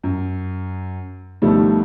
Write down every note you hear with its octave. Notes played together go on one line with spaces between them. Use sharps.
F#2
D2 B2 D#3 F3 G3 A3